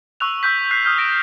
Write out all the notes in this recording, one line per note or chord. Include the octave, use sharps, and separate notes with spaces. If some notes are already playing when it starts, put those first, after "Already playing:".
C#6 E6 F#6 F7
C#6 E6 F#6 G6 B6
F#6 G6 B6 C7
D#6 F6 G6
D#6 A#6 D7 E7